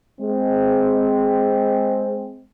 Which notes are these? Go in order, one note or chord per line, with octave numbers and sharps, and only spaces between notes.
G#3 C4